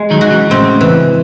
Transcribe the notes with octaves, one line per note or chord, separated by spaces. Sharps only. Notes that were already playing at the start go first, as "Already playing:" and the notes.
Already playing: G#3
D#3 F#3
F#4
C#3 E3
A2 C#3 C4
E3